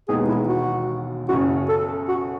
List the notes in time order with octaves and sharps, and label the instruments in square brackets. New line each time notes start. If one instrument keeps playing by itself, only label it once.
[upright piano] E1 D#2 D#3 G#3 B3 [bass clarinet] G#4
[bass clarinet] E4
F#4
[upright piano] F#1 F#2 C#3 [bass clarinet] F#4
[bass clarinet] A4
F#4